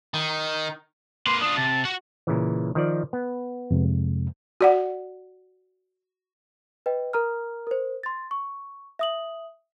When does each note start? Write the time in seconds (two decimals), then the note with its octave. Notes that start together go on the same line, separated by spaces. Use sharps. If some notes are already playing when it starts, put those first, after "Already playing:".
0.14 D#3
1.27 A#3 B4 C6
1.41 D4 F4 D#6
1.57 C3 A5
1.85 F#4 F#5
2.27 A#2 C#3 E3
2.75 D#3 F3 D5
3.13 B3
3.71 F2 C3 G#3
4.61 F#4 D5 F#5
6.86 B4 D#5 G5
7.13 A#4 A#5 F6
7.67 A#4 C5
8.03 C6 A6
8.31 C#6
8.99 E5 D#6 F#7